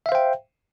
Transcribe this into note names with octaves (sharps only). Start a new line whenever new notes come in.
C5 E5 F5 G5